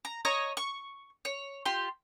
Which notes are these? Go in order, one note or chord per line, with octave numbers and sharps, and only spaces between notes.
A#5
C#5 D#5 A#5 C#6
C#6
C#5
F4 G4 C6